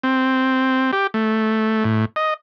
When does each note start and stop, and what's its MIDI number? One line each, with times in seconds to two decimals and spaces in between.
0.03 0.91 60
0.93 1.07 67
1.14 1.84 57
1.84 2.05 45
2.16 2.34 75